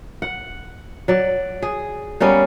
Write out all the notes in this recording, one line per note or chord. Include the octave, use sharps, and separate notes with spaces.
F#5
F#3 D5
G#4
G3 A#3 B3 C#4